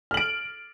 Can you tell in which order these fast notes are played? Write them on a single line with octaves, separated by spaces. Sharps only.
F6 F#7 D7